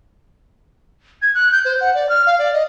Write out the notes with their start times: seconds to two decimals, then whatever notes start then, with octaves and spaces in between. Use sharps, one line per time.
1.22 G#6
1.34 F#6
1.52 G6
1.65 C5
1.81 F#5
1.94 D5
2.09 F6
2.26 F5
2.39 D5
2.53 D#5